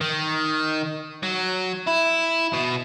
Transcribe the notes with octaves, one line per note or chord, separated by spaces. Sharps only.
D#3
F#3
E4
B2